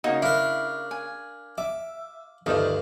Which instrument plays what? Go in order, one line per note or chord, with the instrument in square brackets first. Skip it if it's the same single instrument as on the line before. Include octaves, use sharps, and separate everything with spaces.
[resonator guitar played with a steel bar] C#3 A#3 [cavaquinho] D#4 F#4
[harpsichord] D4 A#4 [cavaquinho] E4 [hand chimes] F5 F6 F#6
[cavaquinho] G#5
[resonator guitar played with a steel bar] E5 [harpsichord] D6
[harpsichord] D2 G2 [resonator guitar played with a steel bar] D#3 F3 D5